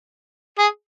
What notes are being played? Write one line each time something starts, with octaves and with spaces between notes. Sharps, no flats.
G#4